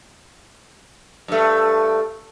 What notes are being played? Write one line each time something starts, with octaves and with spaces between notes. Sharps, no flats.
G2 A3